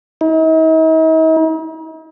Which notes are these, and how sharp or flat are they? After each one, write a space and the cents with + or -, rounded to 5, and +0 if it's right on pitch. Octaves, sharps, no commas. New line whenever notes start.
D#4 +45